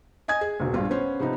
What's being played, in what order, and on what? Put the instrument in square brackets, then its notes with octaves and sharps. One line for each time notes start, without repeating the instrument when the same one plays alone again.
[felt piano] D#5 G#5 D#6 G#6
G#4
E1 A#1
A#1 G2 F4
B3 C#4 C5
C3 F3 B3 D#4